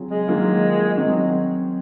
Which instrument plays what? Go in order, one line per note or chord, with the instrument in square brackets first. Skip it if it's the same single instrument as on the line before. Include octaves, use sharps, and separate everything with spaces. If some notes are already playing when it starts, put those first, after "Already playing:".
Already playing: [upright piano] C#3 F#3 C4 F4 G#4
[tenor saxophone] G#3
[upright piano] D#3 F#3 A#3 F4
D#3 F#3 C4 F#4